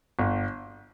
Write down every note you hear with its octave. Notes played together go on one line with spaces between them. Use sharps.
G1